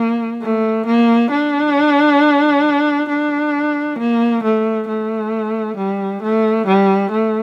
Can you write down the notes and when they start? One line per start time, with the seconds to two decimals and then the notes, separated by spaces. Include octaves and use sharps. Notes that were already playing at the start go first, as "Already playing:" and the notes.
Already playing: A#3
0.42 A3
0.86 A#3
1.31 D4
3.09 D4
3.99 A#3
4.44 A3
4.88 A3
5.77 G3
6.23 A3
6.67 G3
7.11 A3